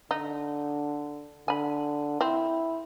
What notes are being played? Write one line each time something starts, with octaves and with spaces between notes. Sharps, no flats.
D3 D#4
D3 G#5 B5
C4 E4